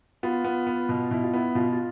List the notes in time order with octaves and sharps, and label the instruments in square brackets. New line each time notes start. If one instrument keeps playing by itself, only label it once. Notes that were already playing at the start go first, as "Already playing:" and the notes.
[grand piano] B3 [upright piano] F4
[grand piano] B3
B3
B2
[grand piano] B2 [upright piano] E4
[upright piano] F4
[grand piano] B3 [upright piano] E4
[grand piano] B2 [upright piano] F4
[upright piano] F4